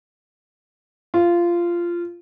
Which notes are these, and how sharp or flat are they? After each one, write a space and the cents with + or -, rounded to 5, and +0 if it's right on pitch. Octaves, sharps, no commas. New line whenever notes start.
F4 -15